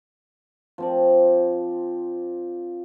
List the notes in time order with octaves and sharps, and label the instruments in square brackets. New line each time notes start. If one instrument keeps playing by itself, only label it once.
[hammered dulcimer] F3 C4 D5